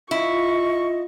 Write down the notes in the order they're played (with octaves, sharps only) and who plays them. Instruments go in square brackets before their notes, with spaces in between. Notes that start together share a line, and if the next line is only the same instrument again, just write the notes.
[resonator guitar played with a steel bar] E4 [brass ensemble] F4 [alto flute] D#5 [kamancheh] C#6